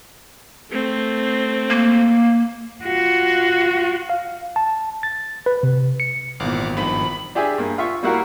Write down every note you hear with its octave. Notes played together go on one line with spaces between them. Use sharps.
A3 C4
A#3
F4 F#4
F5
A5
A6
B4
C3
C#7
G#1 E2 A#2 E4 F5 F#5 D6
G2 D#3 F3 B5
D4 G4 G#4 E5 G#5
G2 A#3
F4 E5 C#6
G3 A#3 E4 F#4 A#4 F5